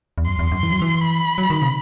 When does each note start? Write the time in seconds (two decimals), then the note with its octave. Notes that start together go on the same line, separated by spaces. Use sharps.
0.18 E2
0.26 F#2 C6
0.39 E2
0.52 F#2
0.63 E3
0.72 F#3
0.82 E3
1.01 B5
1.38 F#3
1.50 D#3
1.62 C3